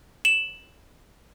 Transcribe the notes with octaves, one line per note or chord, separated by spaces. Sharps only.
E7 F#7